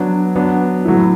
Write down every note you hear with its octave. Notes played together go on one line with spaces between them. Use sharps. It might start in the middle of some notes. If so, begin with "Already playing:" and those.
Already playing: F#3 B3 D4
F#3 B3 D4
A2 F#3 A3 E4